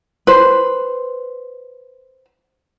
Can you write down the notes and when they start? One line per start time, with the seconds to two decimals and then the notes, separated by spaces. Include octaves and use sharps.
0.27 B4 C5